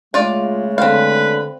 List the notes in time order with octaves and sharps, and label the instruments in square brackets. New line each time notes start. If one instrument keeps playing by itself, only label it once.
[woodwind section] C#3 G#3 A3 [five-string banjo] F4 D5
[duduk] D3 [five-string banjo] C4 F5 [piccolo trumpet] B4